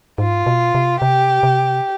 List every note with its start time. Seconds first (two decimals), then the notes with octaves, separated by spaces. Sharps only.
0.18 G#2 F4
0.46 B2
0.75 C3
1.02 C3 G4
1.43 C3